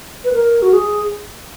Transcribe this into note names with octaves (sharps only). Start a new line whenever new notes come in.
B4
A#4
F#4
G#4